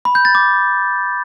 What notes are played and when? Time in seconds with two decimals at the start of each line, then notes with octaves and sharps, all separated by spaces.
0.05 B5
0.15 G6
0.25 A6
0.35 D6